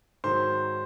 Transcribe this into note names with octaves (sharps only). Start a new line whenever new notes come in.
G#2 D#3 F#3 C5